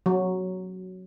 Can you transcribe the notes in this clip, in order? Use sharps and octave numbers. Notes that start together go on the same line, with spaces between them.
F#3